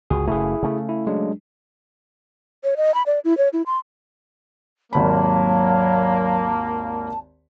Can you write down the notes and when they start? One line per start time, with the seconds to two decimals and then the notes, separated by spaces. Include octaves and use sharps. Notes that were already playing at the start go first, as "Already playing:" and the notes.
0.10 G1 C#2 F#4 G#4
0.28 F#1 C#3 A3 E4 G#4
0.63 C#3 A3
0.89 E4
1.07 F#3 G#3 D4
2.64 C#5
2.77 D#5
2.94 B5
3.06 D5
3.24 E4
3.38 C#5
3.53 E4
3.66 C6
4.93 G#1 D#2 F#3 A#3 A5 B5